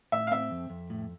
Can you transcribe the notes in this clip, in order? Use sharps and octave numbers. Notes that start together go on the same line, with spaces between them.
A2 E5
F5
C4 E5
F2
F2
A2